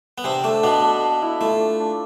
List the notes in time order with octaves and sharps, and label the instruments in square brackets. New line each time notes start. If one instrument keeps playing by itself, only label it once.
[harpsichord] B3
[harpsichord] C3 C4 [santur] D4
[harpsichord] A3 [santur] D4
[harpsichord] B2 B3 [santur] D4
[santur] A4
F5
E4
[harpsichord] A3 [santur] F4
[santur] D4
D4